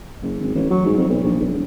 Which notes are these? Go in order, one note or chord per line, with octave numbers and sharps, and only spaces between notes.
F#1
G#1
A1
F#3
G#2
F2
B1
A#1
B1
E1